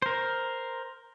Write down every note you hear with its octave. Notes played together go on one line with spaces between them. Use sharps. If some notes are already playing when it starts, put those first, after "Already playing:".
A#4 C5